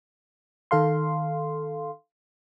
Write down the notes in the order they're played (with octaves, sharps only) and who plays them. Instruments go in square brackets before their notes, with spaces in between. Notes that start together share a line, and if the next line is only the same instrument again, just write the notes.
[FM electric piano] D#3 A4 F5 C6